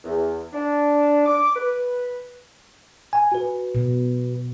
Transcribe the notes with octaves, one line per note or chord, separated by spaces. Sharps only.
E2
D4
D6
B4
G#5
F#4 B4
B2